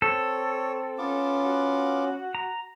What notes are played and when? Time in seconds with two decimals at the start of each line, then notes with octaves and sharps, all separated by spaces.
0.02 C4 A4 C#5
0.98 B3 C#4 F4 D6
1.46 F#4
2.35 A#5